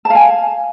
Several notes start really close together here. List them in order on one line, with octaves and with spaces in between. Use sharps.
A5 F5 G#5